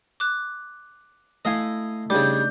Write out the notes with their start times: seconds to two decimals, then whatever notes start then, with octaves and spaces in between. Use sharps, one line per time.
0.20 D6 F#6
1.45 A3 E4 D#5 F5 G#5
2.10 C#3 G3 D4 D#4 D6 G6